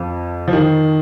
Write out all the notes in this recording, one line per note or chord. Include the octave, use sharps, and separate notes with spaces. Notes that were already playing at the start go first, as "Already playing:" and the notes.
Already playing: F2 F3
F3
D#3